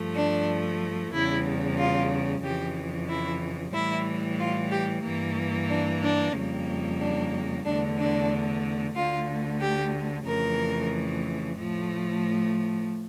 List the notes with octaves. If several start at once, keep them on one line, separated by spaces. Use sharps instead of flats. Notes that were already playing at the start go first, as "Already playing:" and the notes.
Already playing: G2 F3 A3
D4
E2 C#3 G3 E4
F4
F2 C#3 E3 G4
E4
A2 E3 G3 E4
F4
G4
G2 E3 A#3
D4
D4
F2 C#3 G3 A#3
D4
E2 D3 A3 D4
D4
D2 D3 A3 F4
G4
F2 C#3 E3 A3 A#4
A2 F3 A3